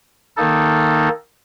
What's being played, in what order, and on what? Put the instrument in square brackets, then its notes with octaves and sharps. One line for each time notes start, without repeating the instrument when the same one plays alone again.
[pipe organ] D#3 A#3 D#4 A4